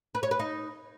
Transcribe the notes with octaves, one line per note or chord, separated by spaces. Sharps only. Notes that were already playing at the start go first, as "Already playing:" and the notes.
B4
C#5
B4
D#4